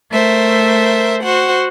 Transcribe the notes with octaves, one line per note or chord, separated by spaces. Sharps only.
A3 A#4 C5 E5
F#4 C5 F#5